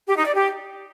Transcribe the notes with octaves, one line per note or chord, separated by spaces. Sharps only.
G4
D#4
D5
G4